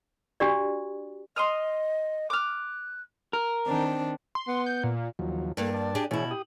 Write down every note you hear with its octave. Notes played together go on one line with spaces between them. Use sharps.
D4 F#4 G4 D5
D#5 C6 D#6 F6
D6 F6 F#6
A#4
D#3 C4 D4
C6
B3
G6
A#2
D#2 F3 F#3
G2 A#3 A4
D5 A5
D4 G4 G#4
B2 E3 E4 G#4 C#5
G4 D#6